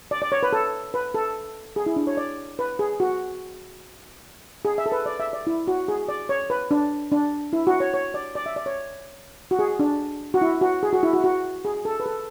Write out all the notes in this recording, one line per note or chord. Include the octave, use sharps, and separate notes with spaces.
D5
D5
C#5
B4
A4
B4
A4
G#4
E4
D4
C#5
D5
B4
G#4
F#4
G#4
E5
A4
B4
D5
E5
D5
E4
F#4
G#4
D5
C#5
B4
D4
D4
E4
F#4
C#5
C#5
D5
D5
E5
D5
C#5
F#4
G#4
D4
F#4
E4
F#4
G#4
F#4
E4
F#4
F#4
G#4
A4
B4
A4